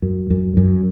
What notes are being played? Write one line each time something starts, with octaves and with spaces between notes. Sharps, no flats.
F#2
F#2
F#2